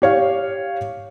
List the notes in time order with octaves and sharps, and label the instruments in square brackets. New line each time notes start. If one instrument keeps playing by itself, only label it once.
[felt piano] G4 C#5 F5